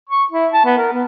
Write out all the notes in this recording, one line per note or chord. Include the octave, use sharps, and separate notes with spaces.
C#6
E4
A5
B3
A#4
B3